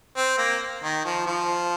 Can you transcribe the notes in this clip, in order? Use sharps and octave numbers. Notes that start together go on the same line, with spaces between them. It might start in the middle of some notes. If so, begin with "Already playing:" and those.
C4
A#3
D#3
F3
F3